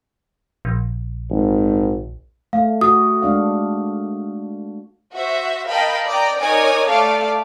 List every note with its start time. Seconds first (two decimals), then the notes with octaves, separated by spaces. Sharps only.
0.65 A#1
1.30 G#1
2.53 A3 F5
2.81 F#4 D#6
3.22 G#3 D4 F5
5.12 F#4 C5 E5
5.68 A#4 D#5 F5 G5 A5 B5
6.07 D5 D#5 G5 A#5
6.40 D#4 A#4 C#5 D5 G#5 D#6
6.88 A3 A4 D5 F5 D6